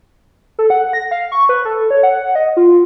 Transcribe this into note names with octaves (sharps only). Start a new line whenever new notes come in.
A4
F#5
A#6
F5
C#6
B4
A4
C#5
F#5
D#5
F4